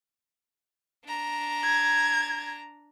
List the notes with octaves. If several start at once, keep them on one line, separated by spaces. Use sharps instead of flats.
D4 A#5
G#6